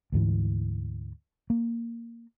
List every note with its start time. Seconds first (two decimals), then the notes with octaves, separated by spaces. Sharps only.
0.12 D2 G#2 E3
1.50 A#3